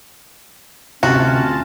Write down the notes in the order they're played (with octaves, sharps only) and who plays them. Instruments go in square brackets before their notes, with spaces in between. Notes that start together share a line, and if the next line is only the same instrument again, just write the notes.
[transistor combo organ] D2 F4 A5 [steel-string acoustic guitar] C3 [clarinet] C#4 [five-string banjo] F#4